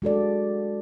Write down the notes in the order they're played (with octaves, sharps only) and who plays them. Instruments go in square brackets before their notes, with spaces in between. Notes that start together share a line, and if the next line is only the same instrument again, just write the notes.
[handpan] G#3 F#4 A4 D5